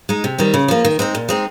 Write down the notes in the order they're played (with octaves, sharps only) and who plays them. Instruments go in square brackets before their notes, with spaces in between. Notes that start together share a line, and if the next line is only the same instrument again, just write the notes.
[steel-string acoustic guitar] G#3 D#4
C3
D#3 G3 C4
C#3
F3 A#3
D#3
G#3 C4 D#4
A#2
G#3 C4 D#4